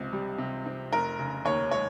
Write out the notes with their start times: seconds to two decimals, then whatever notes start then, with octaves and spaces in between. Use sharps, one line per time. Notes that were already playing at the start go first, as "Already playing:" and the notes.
Already playing: C#2 C3 C4
0.13 G3
0.38 C3
0.66 C4
0.92 F1 A#4
1.19 C#3
1.45 D#2 C#5
1.71 G#3 C#5